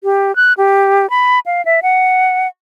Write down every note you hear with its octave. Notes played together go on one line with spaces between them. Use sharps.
G4
F#6
G4
B5
F5
E5
F#5